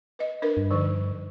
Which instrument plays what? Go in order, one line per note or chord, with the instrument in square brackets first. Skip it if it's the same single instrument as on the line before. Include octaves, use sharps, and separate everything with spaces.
[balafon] B4 D#5
D4 A#4 B4
[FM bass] G2
[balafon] D3 F3 D#4